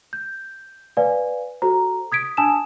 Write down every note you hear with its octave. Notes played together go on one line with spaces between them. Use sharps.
G6
B4 D5 F5 G#5
F#4 A4 C5 A#5
D#6 G#6 B6 D7
D4 G#5 A5 D#6 E6 E7